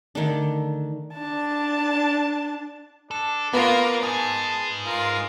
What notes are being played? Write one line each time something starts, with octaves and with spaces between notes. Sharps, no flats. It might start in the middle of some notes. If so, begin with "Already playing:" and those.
D3 D#3 A3 D4
D4 A5
D4 A4
A#3 B3 F4 A#4
D#4 G#4 G#5 A5
F4 A#4 C6